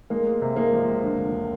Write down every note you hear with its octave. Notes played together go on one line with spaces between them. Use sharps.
G#3 A#3
G#3
C3
G#3 A#3
F3
C#2
D3
E1